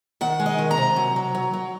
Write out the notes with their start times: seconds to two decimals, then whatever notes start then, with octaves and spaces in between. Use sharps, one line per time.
0.21 D#3 F#5
0.40 G#3
0.46 D#5
0.58 D#3
0.71 A#5
0.78 C3
0.96 F#3
1.16 F#3
1.35 F#3
1.53 F#3